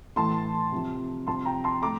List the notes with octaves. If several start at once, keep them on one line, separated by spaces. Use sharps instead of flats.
A2 E3 A5 C6
C3 F3
C3 F3 A5 C6
G5 A#5
A5 C6
A2 A#5 D6